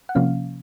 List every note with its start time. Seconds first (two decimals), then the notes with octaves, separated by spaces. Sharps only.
0.09 F#5
0.15 C3 F3 A#3 C#4 F5